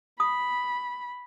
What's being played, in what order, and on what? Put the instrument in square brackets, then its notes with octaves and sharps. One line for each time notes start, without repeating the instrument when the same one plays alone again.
[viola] B5 [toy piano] D#6